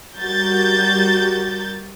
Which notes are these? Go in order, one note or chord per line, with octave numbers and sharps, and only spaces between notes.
G3 F#4 G4 A#4 G6 A6